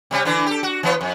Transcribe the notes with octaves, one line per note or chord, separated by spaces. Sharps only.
C3 G3 C#4
D3 E3 D4
G4 A4
F#4
E3 B3 C#5
F2